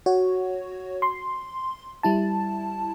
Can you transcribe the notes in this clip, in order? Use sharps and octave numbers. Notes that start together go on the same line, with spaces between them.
F#4 C#5
C6
G3 E4 A5